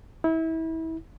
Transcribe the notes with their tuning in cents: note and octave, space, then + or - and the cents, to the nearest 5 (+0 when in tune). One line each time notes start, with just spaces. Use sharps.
E4 -30